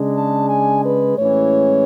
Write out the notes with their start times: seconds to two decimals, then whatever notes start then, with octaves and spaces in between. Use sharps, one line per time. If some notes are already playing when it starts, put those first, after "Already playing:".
Already playing: C#3 G#3 D4
0.14 A5
0.49 G#5
0.83 B4
1.17 A2 E3 G#3 C#4 C#5